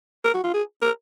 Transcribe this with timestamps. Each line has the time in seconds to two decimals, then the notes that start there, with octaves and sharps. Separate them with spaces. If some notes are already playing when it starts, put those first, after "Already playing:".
0.25 A#4
0.34 F#4
0.44 F4
0.53 G#4
0.82 A#4